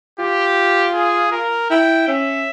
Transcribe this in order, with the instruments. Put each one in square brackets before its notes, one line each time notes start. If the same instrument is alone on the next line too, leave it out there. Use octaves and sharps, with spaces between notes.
[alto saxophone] F4 [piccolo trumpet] G4
[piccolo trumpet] G#4
A#4
[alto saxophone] E4 [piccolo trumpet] G5
[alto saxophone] C#4 [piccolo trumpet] E5